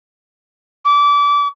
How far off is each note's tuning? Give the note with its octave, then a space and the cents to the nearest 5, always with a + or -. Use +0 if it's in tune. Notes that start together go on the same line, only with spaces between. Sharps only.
D6 -25